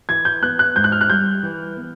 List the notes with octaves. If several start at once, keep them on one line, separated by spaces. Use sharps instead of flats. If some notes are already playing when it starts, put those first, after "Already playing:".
E3 G#6
G6
B3 F#6
F#6
G#2 G6
F#6
F6
F#6
G3 G6
E3
B3